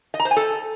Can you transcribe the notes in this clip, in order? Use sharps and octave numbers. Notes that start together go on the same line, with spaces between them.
D#5
A#5
C5
G#5
A4